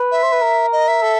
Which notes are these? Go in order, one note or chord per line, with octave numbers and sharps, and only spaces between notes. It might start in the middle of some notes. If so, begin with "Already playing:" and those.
Already playing: B4
E5
C5
B4
A#4
D#5
E5
A4